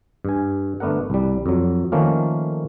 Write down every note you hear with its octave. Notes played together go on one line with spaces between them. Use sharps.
G2 G#5
G1 A3 B3 D4 A#4 F#5
C2 G3
F2 F#3
D#3 F3 A3 A#3 C#4 F4